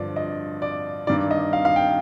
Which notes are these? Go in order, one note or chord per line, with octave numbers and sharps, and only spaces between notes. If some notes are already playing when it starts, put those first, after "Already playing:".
Already playing: G2 D3 F3 D5
D#5
D5
G2 D#3 D5
D#5
F5
F5
G5